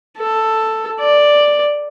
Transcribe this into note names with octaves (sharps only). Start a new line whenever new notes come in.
A4
D5